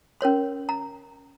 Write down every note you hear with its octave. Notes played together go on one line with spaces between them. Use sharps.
C#4 A#4 C#5 C6
A#5